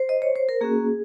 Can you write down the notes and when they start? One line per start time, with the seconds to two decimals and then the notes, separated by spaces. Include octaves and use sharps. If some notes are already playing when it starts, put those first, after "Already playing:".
Already playing: C5
0.09 D#5
0.22 C#5
0.36 C5
0.49 A#4
0.61 A#3 C#4 F#4 G#4